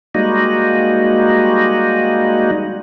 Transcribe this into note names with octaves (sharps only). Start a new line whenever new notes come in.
G3 G#3 A#3 D#4 F#4